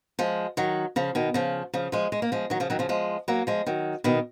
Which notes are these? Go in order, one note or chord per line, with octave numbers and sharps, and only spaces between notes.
F3 G#3
D#3 F#3
C#3 F3
B2 D#3
C#3 F3
C#3 F3
F3 G#3
G#3
A#3
F3 G#3
D#3 F#3
C#3 F3
D#3 F#3
C#3 F3
F3 G#3
F#3 A#3
F3 G#3
D#3 F#3
B2 D#3